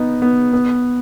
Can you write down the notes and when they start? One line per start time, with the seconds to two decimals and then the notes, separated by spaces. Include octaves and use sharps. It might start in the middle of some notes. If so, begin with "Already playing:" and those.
Already playing: B3 D#4
0.22 B3
0.53 B3